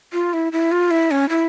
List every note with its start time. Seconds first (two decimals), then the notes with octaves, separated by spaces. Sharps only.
0.13 F4
0.33 E4
0.52 E4
0.72 F4
0.91 E4
1.11 C#4
1.29 E4